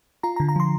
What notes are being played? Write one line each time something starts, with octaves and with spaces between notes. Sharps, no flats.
F4 A#5
A#5
D3
A#5
F3 C6